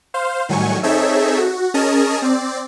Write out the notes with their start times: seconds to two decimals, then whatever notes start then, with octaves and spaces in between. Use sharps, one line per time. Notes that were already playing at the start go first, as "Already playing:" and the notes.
0.14 C5 F5
0.49 A2 D#3 F#3 G3 G#5 C#6
0.83 C4 D#4 G#4 A4 C#5 E5
1.38 F#4
1.74 C#4 G#4 A#4 D#5 A5
2.22 C4 D5